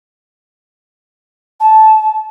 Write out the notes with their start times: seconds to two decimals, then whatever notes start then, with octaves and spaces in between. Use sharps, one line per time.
1.60 A5